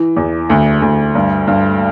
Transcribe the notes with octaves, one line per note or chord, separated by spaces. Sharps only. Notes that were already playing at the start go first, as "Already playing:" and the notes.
Already playing: E3
E2
D2
D2
G2
G2